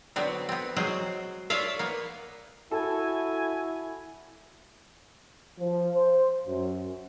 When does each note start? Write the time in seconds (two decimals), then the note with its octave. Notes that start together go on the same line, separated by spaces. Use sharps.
0.16 D3 F#3 B3 C4
0.49 B3 C4
0.76 F#3 G#3 C4 G#4 C5
1.50 F4 C#5 D5 E5 F5
1.79 A#3 B3
2.71 E4 F#4 A4 G#5
5.59 F3
5.95 C5
6.47 F#2